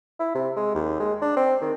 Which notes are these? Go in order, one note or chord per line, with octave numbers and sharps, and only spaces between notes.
E4
C3
G#3
D#2
G#3
D4
C4
D#3